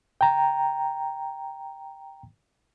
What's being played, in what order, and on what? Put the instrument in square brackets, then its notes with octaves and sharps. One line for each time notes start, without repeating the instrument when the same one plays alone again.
[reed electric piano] G5 A#5